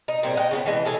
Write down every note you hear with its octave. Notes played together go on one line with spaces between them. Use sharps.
D#4
A#2 G3 C4 G#4
D#5 F#5 G5
C#3 E3 B3
E3 G#3
G#4 A4 C#5